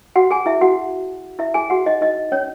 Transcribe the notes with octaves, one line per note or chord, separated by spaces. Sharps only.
F#4 F#5
G#4 G#5
E4 E5
F#4 F#5
E4 E5
G#4 G#5
F#4 F#5
D#4 D#5
D#4 D#5
C#4 C#5